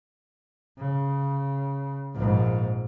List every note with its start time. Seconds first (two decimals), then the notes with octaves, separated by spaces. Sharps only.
0.78 C#3
2.15 A#1 G#2